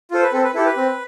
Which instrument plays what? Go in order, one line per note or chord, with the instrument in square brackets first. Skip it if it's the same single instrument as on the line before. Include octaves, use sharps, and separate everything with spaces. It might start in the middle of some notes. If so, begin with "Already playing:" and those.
[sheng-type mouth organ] F4 A4 C5
B4
C4 A4
B4
E4 G4 A4
B4
C4